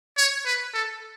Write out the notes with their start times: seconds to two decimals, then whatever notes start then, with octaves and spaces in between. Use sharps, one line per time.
0.18 C#5
0.45 B4
0.74 A4